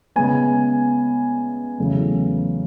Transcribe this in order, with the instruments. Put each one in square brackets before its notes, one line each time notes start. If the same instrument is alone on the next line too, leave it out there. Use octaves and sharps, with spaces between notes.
[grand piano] C#3 G#3 B3 G#5
E2 C#3 F#3 A3